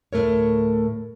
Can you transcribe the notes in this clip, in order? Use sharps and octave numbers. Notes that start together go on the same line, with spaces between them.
D2 A2 A3 A#4 C#5